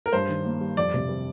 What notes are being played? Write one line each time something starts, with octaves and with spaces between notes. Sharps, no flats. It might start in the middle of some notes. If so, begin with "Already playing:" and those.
A#4
G2 C5
D#3
A#3
G3
F2 D5
C3
G3